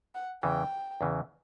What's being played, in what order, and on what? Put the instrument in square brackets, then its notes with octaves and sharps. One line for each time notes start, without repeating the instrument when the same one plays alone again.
[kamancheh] F#5
[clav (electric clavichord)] E2 C#3 E3 [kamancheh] G5
[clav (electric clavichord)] E2 C#3 E3